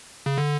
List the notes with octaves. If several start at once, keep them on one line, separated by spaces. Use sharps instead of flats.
C#3
D3